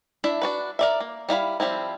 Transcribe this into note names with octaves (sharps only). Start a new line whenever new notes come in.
D4 E4 E5
D4 F#4 B4
A#4 D5 E5
A#3
G3 E4 F5 B5
F3 G3 C4 E4